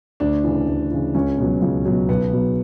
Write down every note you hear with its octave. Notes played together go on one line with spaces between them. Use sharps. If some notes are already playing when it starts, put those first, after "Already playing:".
D2 D4
C#3 E3
D2
C#3 E3
C#2 C#4
B2 F#3
C#2
B2 F#3
B1 B3
B2 F#3